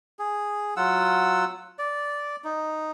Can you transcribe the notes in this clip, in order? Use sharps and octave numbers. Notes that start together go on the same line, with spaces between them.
G#4
F#3 F4 F#5 E6
D5
D#4